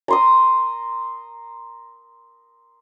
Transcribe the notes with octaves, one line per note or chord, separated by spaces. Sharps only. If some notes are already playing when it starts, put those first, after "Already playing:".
A#5 C6 D#6